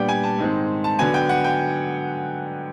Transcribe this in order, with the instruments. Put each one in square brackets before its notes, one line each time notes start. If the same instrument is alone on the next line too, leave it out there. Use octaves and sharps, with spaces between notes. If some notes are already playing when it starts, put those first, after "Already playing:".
Already playing: [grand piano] A#2 G3 B3 D4 F#5 G5
G#5
A5
G#2 D#3 G#3 C4
A5
D3 F#3 B3 G#5
G5
F#5
G5